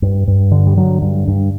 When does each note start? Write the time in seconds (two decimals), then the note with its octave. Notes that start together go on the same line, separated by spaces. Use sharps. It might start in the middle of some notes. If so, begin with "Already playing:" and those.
0.02 G2
0.28 G2
0.51 D3
0.67 G3
0.77 D3 F#3
1.02 G2
1.28 G2